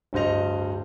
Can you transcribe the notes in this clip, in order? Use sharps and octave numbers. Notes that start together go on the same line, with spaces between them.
D1 G2 C5 D#5 F7